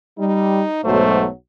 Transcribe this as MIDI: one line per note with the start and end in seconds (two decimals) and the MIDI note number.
0.19 0.61 55
0.19 0.82 63
0.84 1.24 35
0.84 1.24 44
0.84 1.24 54
0.84 1.29 57
0.84 1.23 72